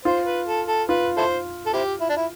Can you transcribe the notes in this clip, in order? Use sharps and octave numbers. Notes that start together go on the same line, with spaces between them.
F4 C5
B4
A4
A4
F4 B4
E4 A4 C5
A4
C4 E4 G4
E4
D4
E4